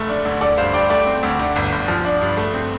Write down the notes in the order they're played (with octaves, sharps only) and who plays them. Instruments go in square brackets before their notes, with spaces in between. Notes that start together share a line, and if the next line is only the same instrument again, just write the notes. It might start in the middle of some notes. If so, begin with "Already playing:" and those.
Already playing: [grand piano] F1 A3
D4
D2
D4 A4 D5
G2 C5 F5
G2 D5 G5
A3 D5 G5
C4
D2
D3
G1
G1
F3
D4
G2
A3
C4